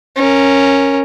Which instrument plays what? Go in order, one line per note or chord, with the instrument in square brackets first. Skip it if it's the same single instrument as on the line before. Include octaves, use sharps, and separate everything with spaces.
[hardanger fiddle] C#4 A#4